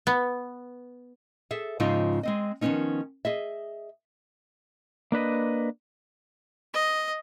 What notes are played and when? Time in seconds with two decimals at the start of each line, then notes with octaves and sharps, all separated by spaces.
0.07 B3
1.51 G#4 A4 E5
1.80 G#2 C#3 F3 C4 D#4 F4
2.23 G#3 C4 D#5
2.61 D#3 F3 A#3 B3 C#4 D#4
3.25 G#4 D#5 E5
5.12 A#3 D4 B4 D#5
6.74 D#5